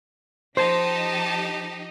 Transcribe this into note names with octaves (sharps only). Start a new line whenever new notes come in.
F3 D#4 G4 C5 A5